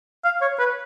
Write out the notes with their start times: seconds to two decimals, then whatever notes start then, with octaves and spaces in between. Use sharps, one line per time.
0.24 F5
0.41 C#5
0.59 B4